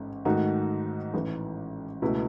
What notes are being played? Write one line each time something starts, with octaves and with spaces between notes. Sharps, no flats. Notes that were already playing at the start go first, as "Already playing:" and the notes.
Already playing: A1 G#2
G#2 D#3 A3 D#4 F#4
A1 A2 E3
C#2 B2 A3 E4